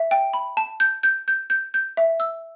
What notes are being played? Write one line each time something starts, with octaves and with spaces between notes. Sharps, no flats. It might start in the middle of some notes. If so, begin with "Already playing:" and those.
Already playing: E5
G5
B5
A5
G6
G6
G6
G6
G6
E5
E6